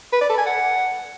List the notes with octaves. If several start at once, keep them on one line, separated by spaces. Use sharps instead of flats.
B4
D5
A4
G#5
F#5